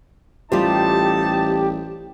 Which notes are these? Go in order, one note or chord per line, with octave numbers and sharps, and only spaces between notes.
A1 G3 A3 D#4 F4 G4 C5 A5